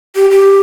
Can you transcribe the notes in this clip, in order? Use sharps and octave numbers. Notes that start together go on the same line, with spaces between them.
G4
G4